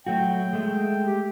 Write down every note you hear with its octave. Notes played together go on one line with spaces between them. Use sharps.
F#3 A3 F#4 G5
G#3 A3
G4